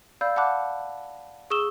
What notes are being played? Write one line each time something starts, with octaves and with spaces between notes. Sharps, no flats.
D5 F5 B5 E6 G6
F5 F#5 A5 B5 D6 F#6
G#4 C#6 D#6 E6 E7 G7